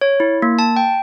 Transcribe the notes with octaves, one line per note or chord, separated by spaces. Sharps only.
C#5
E4
A#3
A5
G5